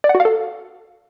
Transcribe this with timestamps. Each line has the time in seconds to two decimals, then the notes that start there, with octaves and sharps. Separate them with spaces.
0.04 D5
0.09 F#5
0.15 F#4
0.20 F5
0.25 A4